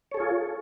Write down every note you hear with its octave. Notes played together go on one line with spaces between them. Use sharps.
F4 G#4 A4 C#5